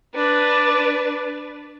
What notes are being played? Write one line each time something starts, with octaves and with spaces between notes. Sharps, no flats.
D4 B4